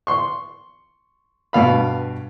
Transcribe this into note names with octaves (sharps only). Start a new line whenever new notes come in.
C6 C#6
G2 B2 F5 B5